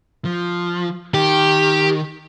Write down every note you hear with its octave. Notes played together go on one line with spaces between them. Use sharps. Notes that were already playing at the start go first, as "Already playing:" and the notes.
F3
D#3 G4